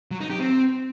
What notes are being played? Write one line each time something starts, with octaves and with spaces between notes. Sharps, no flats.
F#3
D#4
G4
C4